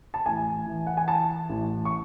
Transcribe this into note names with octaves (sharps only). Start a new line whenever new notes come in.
A5
A1 G#5
E3
F#5
G#5
E3 A5
A1
C#6